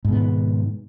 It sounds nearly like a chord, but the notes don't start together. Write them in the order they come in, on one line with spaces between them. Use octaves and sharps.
G#2 B2 B3 D#3